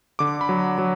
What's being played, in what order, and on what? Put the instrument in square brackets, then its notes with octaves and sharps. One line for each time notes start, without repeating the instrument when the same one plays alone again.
[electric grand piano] D3 D6
B5
F#3
F#3